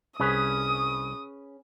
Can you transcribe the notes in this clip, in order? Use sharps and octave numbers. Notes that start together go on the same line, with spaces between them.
C2 C#4 G#4 B4 D#6